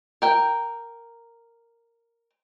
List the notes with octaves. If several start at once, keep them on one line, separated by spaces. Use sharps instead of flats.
A#4 G5